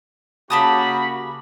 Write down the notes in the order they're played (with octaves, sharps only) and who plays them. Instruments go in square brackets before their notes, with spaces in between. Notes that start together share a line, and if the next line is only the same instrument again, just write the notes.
[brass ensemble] C#3 A#3 F#4 [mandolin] G4 A5 D#6 [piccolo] B5